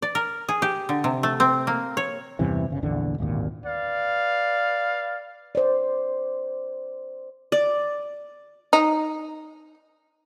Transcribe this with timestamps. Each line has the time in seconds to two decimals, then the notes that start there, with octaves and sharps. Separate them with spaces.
0.02 D5
0.15 A#4
0.49 G#4
0.62 G4
0.89 D3
1.04 C3
1.23 A3
1.40 C4
1.67 A#3
1.97 C#5
2.39 E2 G2 C3 E3
2.70 G1 C#3
2.82 A#1 E2 D3 D4
3.18 D1 G#1 D#2 A#2
3.65 B4 D5 F5
5.55 C5 D5
7.52 D5
8.73 D#4